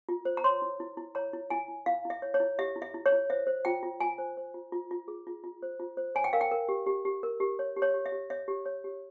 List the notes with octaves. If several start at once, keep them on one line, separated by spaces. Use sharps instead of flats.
F4
C5
A#5
C#5 C6
E4
E4
E4
C#5 A#5
E4
E4 G#5
E4
E4 F5
E4
E5
C#5
C#5
E4
G4 E5
E4
E5
E4
C#5
E4
C5 E5
C5
F4 G5
F4
F4 G#5
C5
C5
F4
F4
F4
G#4
F4
F4
C5
F4
C5
C#5 G#5
G5
A#4 F5
G5
A#4
G4
G4
G4
A#4
G4
C#5
G4
C#5
G4
E5
G4
C#5 E5
G4
C#5
G4